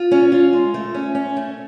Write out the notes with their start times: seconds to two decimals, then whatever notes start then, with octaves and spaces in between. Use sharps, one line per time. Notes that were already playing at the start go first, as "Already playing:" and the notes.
Already playing: F4
0.11 C#4
0.32 F4
0.53 G#3
0.74 A3
0.94 C#4
1.15 C#4
1.37 A3